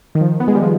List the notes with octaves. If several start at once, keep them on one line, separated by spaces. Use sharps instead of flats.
D#3
F3
B3
G#3
G3
F3